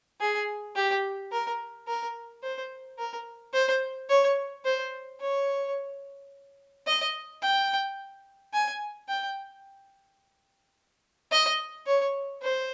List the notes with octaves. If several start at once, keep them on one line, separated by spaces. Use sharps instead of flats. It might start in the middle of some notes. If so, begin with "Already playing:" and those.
G#4
G4
A#4
A#4
C5
A#4
C5
C#5
C5
C#5
D#5
G5
G#5
G5
D#5
C#5
C5